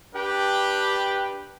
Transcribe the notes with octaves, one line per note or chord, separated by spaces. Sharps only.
D4 G4 B4 G5